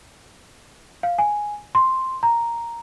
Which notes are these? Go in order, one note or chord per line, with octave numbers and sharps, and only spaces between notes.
F5
G#5
C6
A#5